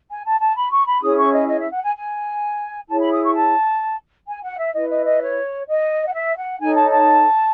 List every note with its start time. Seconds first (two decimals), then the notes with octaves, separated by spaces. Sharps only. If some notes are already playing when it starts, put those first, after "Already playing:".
0.10 G#5
0.26 A5
0.41 A5
0.56 B5
0.72 C#6
0.87 B5
1.02 C#4 E4 G#4 D#6
1.17 C#6
1.34 D#5
1.48 D#5
1.61 E5
1.72 F#5
1.83 G#5
1.96 G#5
2.89 E4 G#4 C#5 A5
3.00 B5
3.12 D#6
3.23 C#6
3.35 A5
4.28 G#5
4.43 F#5
4.58 E5
4.74 E4 B4 D#5
4.89 D#5
5.06 D#5
5.21 C#5
5.68 D#5
6.07 F#5
6.13 E5
6.38 F#5
6.60 D#4 A4 C#5 G#5
6.75 A5
6.91 A5